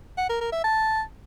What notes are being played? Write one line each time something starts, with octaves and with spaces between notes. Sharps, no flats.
F#5
A#4
A#4
E5
A5